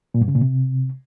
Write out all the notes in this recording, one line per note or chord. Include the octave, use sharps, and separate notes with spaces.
A#2
G2
C#3
A#2
C3